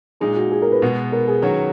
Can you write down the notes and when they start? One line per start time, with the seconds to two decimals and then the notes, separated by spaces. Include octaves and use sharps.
0.20 A#2 G#3 D#4 G#4
0.37 F#4
0.51 G#4
0.62 A#4
0.72 B4
0.82 B2 G#3 B3
1.12 A#4
1.27 G#4
1.42 D#3 F#3 C#4 F#4 C#5